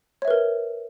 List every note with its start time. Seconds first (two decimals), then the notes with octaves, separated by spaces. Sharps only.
0.22 C#5
0.25 E5
0.28 B4
0.30 A#4